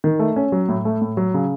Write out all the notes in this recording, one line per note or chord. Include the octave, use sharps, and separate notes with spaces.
D#3
A3
C#4
F#3
A2
A3
A2
F#3
C#3